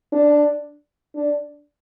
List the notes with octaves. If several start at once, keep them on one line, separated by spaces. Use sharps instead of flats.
D4
D4